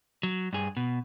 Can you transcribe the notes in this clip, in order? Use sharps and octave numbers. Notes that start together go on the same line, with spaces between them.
F#3
G2 G#4
B2